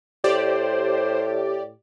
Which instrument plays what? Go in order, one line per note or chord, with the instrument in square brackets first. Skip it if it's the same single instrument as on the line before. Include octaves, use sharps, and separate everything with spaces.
[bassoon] A2 [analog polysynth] G4 D5 [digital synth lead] C5